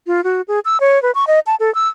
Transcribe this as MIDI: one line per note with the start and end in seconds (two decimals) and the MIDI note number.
0.07 0.24 65
0.24 0.42 66
0.48 0.60 68
0.65 0.80 88
0.80 1.01 73
1.03 1.11 71
1.15 1.25 85
1.27 1.40 75
1.47 1.55 81
1.60 1.73 69
1.75 1.88 88